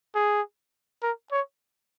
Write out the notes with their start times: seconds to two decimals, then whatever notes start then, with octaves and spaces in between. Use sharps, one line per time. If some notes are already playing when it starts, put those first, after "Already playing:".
0.15 G#4
1.03 A#4
1.32 C#5